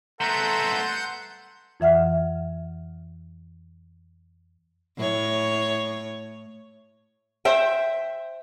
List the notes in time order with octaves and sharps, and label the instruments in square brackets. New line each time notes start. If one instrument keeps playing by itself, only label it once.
[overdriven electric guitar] A3 B3 [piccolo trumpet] A4 [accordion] F#5 C6 G6 [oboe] A#5
[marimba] F2 E3 E5 F#5 F6
[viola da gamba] A2 C#5
[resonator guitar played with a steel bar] C5 E5 G5